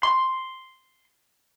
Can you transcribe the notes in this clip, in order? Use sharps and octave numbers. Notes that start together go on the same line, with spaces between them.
C6